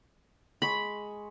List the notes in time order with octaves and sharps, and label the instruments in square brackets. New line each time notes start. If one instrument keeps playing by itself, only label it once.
[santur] G#3 C#6 [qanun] B5